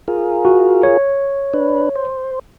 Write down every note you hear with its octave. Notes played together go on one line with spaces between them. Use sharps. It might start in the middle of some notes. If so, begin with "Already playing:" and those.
F4 G#4 A#4
F#4
C#5
D4 B4
C5